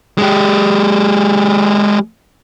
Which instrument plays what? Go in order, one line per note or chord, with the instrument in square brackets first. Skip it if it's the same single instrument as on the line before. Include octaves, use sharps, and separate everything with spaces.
[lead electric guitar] G#3 G4